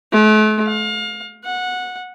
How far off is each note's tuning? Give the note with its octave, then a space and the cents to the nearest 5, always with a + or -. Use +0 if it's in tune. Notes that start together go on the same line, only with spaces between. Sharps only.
A3 -40
F5 +30
F#5 -15